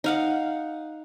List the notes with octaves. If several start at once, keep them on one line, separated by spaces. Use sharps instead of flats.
D#4 F5 F#5